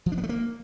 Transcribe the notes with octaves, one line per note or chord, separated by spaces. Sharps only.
F3
D4
B3
A3
A#3